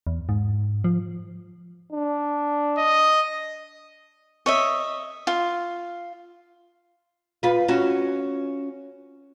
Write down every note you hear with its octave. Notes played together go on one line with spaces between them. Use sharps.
E2
G#2
F3
D4
D#5
C#5 D#5 E5
F4
F4 B4
C#4 F#4